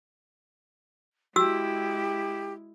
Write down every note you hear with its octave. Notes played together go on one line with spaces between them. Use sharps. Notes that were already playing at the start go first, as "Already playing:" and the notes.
G#3 E4 F#4 G4 E6